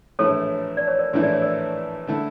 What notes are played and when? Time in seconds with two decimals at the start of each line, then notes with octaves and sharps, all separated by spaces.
0.19 A#1 A2 E3 A3 E4 A4 C#5
0.77 D5
0.88 C#5
0.99 A#4 D5
1.13 A#1 A2 E3 A3 E4
1.23 D5
1.33 C#5
1.42 A#4 D5
2.07 D3 A3 E4